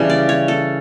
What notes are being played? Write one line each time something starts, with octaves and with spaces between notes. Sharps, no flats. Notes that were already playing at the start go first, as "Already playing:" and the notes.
Already playing: C#3 E3 G3 C#4 A4
D5
C#5
A4